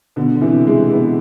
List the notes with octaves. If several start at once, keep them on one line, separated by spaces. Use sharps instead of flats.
B2 D3
D3
C3 E3
E3 G#3
G#3 B3